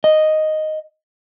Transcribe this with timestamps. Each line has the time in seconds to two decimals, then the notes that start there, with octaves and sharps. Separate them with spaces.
0.04 D#5